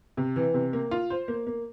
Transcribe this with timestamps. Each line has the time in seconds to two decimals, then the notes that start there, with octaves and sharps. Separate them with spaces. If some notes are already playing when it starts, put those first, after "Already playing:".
0.17 C3
0.36 E3
0.54 C3
0.73 A#3
0.91 F4
1.10 C5
1.28 A#3
1.47 A#3